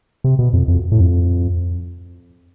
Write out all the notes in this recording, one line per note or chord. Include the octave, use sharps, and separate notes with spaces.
C3
B2
F2
F2
A2
F2